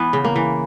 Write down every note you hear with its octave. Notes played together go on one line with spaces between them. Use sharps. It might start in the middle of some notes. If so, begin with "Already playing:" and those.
Already playing: E3 B3
C#3
A#3
E3